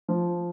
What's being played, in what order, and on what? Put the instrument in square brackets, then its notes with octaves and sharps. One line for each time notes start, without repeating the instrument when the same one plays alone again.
[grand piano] F3